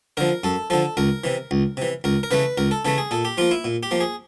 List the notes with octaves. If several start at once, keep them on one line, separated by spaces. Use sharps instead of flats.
D3 F3 A#4
F#2 A4
D3 F3 A4
C#2 A#4
C3 E3
C#2
C3 E3
C#2 A#4
A#4
C#3 E3 A3 B4
C#2 A#4
A4
C#3 E3 A3 A4
G#4
A#2 A4
G4
F3 A#3 F4
E4
A#2
G4
F3 A#3
G#4